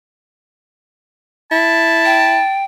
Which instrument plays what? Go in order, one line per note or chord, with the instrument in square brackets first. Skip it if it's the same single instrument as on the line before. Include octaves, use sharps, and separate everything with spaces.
[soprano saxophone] E4 [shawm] A5
[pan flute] G5